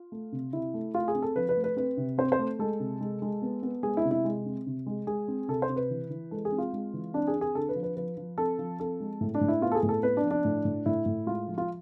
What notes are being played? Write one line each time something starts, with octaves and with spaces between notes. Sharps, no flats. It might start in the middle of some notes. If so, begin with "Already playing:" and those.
Already playing: F4
A3
C3
C3 E4
A3
A3 F4
G#4
C4
A4
F3 B4
B4
A3
B4
C4 B4
C3
C4 C5
C5
A3
G#3 A4
C3
G#3
G#3
B3
B3
G#3 G#4
E4
C3
E4
G#3
C4
C3
G#3
G#3 G#4
C4
C3 A4
C5
C3
B4
E3
E3
G#3 A4
G#4
C4
F4
G#3
E3
C4 D4
G#4
C4
G#4
D3 A4
B4
F3
B4
F3 B4
F3
C4 A4
F3
C4 A4
G#3
A2
D4
A2
E4
B3 F4
A4
G#4
A2
A4
B3 B4
D4
F3
D4
A2
A2
A2 E4
A2
G#3 F4
F3
F4